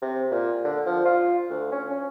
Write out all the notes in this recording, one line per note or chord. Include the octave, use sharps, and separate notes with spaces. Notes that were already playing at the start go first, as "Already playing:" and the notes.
C3
A#2
D3
F3
F4
D2
C#4
C#4